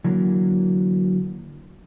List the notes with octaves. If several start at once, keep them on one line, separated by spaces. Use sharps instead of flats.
D3 E3 F#3 A#3